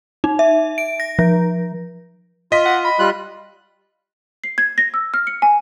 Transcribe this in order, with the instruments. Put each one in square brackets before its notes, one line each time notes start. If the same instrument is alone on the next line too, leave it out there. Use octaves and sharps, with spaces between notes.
[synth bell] D#4
E5
D7
A#6
F3
[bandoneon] F4 [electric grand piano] D#5 B6
[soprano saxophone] F#5
B5
[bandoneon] G3 F4 F#6
[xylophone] C7
G#6
A#6
E6
F6
C#7
G#5